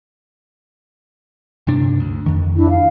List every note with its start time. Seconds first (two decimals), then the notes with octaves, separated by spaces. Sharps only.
1.67 G2 C3 D4
2.00 D2
2.26 F2 D#3
2.55 D4 E4
2.69 F5